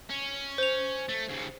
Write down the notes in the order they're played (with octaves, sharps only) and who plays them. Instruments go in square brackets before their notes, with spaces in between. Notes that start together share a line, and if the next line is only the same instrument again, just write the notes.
[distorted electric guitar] C#4
[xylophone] C5 F7
[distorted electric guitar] A3
D#2 C#3